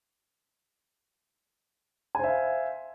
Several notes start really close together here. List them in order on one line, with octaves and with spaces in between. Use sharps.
G#5 C5 E5 F5